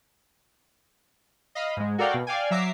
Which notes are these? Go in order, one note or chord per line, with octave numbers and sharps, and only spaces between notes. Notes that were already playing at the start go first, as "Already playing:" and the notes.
D#5 F5 B5
G#2 G#3
F#4 A4 A#4 D5 F5 G5
B2
D5 F5 G5 G#5
F#3 E5 A#5 D6 C7